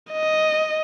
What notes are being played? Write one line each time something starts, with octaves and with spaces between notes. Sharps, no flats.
D#5